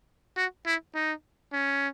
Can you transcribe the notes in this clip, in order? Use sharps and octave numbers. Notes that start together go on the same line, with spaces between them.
F#4
E4
D#4
C#4